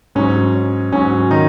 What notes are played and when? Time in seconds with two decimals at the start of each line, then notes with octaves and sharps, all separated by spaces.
0.15 G#2 F#3 C#4
0.92 G#2 F#3 C#4
1.30 D#3 D#4